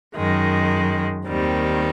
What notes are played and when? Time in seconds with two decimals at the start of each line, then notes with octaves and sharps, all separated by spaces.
0.16 F#2 D#3 G#3
1.26 D#2 D#3 G3 C4